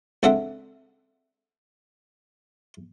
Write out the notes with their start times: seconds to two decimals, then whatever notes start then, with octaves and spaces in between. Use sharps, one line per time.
0.23 C#2 C4 D4 A4 E5 F#5